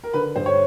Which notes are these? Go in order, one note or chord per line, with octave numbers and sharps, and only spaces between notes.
A#4
D3 B4
G2 C5
C#5